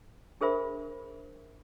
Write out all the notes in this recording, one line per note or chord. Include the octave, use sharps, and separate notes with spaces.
D4 G#4 A#4 C5 E5 B5